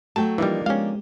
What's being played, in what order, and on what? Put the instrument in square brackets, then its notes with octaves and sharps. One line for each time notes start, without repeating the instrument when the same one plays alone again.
[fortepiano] F#3 [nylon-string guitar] A3 G5 [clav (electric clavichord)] A5
[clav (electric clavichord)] E3 G3 [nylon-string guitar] F3 [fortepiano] A#3 D4 D#4
[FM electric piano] G#3 B3 G4 [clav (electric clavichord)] C#4 F5